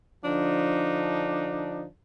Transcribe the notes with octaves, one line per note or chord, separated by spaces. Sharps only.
D3 F3 D4 D#4